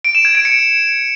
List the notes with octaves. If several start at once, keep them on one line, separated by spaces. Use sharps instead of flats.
D7
E7
G#6
D7
C#7